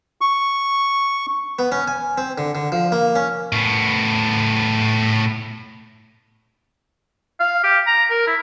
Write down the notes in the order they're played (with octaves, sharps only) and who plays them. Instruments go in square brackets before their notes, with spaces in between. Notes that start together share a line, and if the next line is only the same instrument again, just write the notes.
[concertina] C#6
[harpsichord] B3
C#4
G#5
C4
D3
D3
F3
A#3
C#4
[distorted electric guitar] A2 B3
[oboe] F5
G4
A#5
A#4
E4